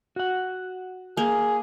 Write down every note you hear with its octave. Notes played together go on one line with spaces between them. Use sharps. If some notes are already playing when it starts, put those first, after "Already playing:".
F#4 F#5
A#3 G#4